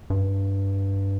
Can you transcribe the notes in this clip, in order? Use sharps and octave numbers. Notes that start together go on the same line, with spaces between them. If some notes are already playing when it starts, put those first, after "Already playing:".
G2